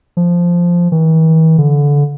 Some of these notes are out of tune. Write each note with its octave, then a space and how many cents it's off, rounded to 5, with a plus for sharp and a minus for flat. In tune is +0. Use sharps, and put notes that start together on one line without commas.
F3 -5
E3 -45
D3 -25